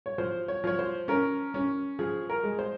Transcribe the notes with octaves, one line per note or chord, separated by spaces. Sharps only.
C#5
F3 C5
C#5
F3 C#5
C5
C#4 A#4
C#4
F3 G#4
A#4
G#3
C5